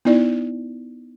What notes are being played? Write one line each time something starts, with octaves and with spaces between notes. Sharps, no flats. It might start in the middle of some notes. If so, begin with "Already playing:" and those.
B3 D#4 E4 D5